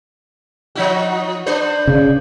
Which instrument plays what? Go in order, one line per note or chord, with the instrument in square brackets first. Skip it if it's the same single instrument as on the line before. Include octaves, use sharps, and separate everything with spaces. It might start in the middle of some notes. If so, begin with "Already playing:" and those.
[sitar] F3 D#4 F#4
D4 B4 C5
[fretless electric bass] C#3